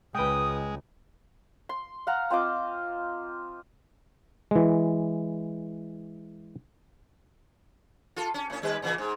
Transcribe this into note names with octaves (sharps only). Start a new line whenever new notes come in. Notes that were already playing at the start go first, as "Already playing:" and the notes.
C#2 G#3 B4 G5 D#6
C6
F5 F#5 A#5
C4 F4 D#5 D6
E3 G#3
F4 A4
C#4
A2 C#4
D#2 G3 B4
A#2 C#3 E3
G#2